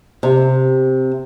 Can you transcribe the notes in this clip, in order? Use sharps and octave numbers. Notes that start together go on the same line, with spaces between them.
C3